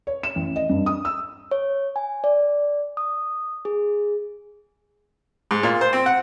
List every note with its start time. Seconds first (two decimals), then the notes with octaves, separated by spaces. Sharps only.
0.07 C#5
0.23 E7
0.36 A1
0.56 D#5
0.69 G2
0.86 D#6
1.05 E6
1.51 C#5
1.96 G#5
2.24 D5
2.97 D#6
3.65 G#4
5.51 G#2
5.63 A#2
5.81 C5
5.93 C4
6.06 F#5